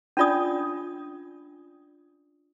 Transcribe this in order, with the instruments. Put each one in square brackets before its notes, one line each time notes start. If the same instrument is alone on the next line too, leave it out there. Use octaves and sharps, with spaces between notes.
[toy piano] C#4 D4 F4 D5 D#6